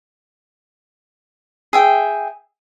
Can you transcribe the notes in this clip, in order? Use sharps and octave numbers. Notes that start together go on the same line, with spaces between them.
G#4 E5 G5